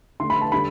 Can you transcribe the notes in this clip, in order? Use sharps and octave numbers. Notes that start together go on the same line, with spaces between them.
D3 A3 C6
B5
A5
D3 G3 B5